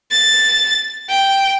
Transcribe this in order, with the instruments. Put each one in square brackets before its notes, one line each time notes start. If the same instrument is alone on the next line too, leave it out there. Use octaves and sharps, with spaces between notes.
[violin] A6
G5